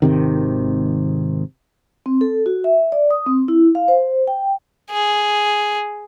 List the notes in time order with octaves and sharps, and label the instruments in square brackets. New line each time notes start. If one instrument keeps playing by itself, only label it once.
[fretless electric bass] G#1 C3 D#3
[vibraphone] C4
A4
F#4
E5
D5
D#6
C4
E4
F5
C5
G5
[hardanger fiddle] G#4